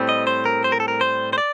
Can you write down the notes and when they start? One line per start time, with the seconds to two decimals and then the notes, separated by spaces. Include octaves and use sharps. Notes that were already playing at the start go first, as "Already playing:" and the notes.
Already playing: A2 G3 C4
0.09 D#5
0.27 C5
0.45 A#4
0.64 C5
0.72 A#4
0.80 A4
0.88 A#4
1.01 C5
1.33 C5
1.38 D5